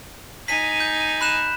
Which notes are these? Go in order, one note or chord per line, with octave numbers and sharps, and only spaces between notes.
D#4 G#5 B6 D#7
G6
B5 F#6 E7